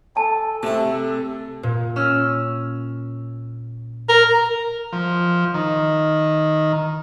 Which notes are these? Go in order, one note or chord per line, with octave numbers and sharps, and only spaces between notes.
A4 G#5 A5
C3 A3 E4
A#2
C#4 E6 F6
A#4
F3
D#3